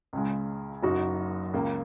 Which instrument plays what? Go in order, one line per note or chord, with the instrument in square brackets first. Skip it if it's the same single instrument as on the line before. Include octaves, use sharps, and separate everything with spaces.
[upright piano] C#2 C#3 G#3
F#1 F#2 F#3 D#4 F#4
C#2 C#3 A#3